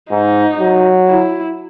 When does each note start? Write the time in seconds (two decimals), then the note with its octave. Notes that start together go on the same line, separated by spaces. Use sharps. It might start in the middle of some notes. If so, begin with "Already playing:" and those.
0.11 G#2 D#4
0.60 F#3
1.09 E4